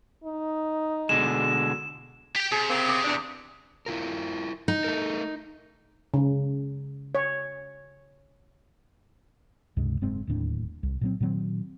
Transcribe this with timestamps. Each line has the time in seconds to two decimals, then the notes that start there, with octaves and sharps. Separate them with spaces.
0.24 D#4
1.09 B2 D3 G#3 E7
2.36 G4 G5
2.52 C3 G#4
2.70 C#3 A#3 C4
2.89 D6
3.05 E2 D4
3.86 E4 F4 A#4
4.68 D#4
4.84 A3 A4 A#4
6.14 C#3
7.15 C#5
9.77 C#2 G2 C3 G#3
10.01 F#1 G#2 G#3 C4
10.27 D1 D#2 A2 D4
10.83 C2
11.01 A#2 F#3 C4
11.20 A#2 D#3 F#3 C4